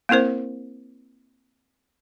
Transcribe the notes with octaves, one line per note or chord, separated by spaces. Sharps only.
A#3 C4 E4 A#4 C5